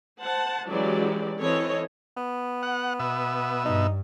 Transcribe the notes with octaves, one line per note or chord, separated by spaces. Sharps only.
C5 F#5 A5
E3 F#3 G#3 C#4 G4 D5
E3 C4 A4 C#5 D#5
B3
F#5
B2 E5
G2 D#4